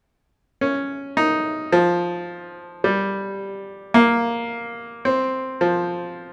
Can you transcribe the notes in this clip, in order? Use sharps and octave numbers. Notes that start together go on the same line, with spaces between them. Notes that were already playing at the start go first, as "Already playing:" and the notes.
C#4
D#4
F3
G3
A#3
C4
F3